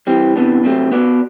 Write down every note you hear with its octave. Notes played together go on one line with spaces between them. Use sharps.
E3 G3 C4
C3 E3 B3 D4
C3 F#3 A3 C4
B3 F#4 B4 D5